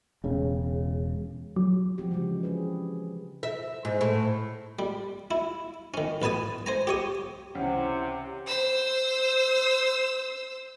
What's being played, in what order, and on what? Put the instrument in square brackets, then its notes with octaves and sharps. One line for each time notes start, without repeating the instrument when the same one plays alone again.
[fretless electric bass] E1 C#3
[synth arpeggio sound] F#3
[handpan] F3 G3 G#3 C4 F#4 G4
C#3 E3 F3 G3 G#3
G#3 G#4 B4
[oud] E5
G#2
A2
[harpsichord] G3
E4
D#3 C#4
A1 B4 G#5 A5 D#6
C5 G#5 A#5
G4 C#5 D#6
[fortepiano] C#2 E3 [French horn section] C3 [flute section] F#5
[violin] C5 E6